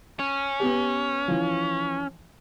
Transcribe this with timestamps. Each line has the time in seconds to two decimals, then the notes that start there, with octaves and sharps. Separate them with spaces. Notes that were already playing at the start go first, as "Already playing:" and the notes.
0.19 C#4
0.60 B3 G4
1.28 E3 F3